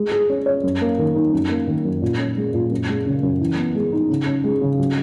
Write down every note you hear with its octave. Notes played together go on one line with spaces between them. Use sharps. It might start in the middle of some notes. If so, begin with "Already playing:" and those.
Already playing: G#3
G#4
C#4
C#5
F#2
A#3
D#3
D#4
F#2
A#3
D#3
F#2
A#2
C#4
G#3
A#2
F#2
G#3
C#3
F#2
E3
B3
G#3
D#4
C#3
C#4
G#3
C#3
F#3